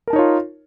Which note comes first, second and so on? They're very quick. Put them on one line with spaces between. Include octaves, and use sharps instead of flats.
A#4 A5 D#4 C#5 F4